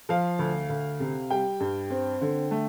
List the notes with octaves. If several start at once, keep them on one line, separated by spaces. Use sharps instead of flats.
F3 F5
D2
D2
C3
G3 G5
G2
C4
D3
A3